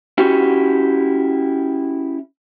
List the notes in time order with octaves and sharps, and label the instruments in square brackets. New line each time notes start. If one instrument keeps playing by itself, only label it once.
[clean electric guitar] C#4 E4 F#4 G4